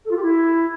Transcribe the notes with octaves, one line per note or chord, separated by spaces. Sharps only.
A4
F4
G4
E4